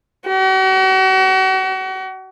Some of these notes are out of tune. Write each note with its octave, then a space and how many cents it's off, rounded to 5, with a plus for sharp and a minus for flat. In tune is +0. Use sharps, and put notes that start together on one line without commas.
F#4 +40